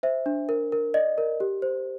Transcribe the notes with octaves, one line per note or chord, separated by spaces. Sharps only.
C5 E5
D4
A#4
A#4
D5 D#5
A#4
G4
C5